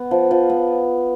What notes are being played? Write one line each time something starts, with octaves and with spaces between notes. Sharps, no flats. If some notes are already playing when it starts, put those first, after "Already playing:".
Already playing: B3
F3
F3
B3